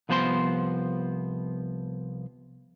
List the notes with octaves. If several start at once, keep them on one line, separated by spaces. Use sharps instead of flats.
C2 F3 B3 C5 B5 C6